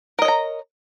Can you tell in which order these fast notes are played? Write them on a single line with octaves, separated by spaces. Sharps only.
A#4 D#5 C#5 A#5